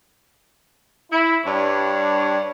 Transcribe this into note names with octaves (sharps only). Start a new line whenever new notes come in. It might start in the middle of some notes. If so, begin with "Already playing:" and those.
E4
G2 D4 C#5